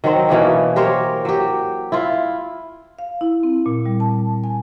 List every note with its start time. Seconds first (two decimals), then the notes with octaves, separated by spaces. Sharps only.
0.04 D#3 F#3 C4
0.29 B2 E3 A#3 C#4
0.76 G4 A#4 C5 C#5
1.25 F#3 G4
1.92 E4 F4
2.99 F5
3.21 E4
3.43 C4
3.66 A#2
3.86 G3
4.00 A5
4.44 G#5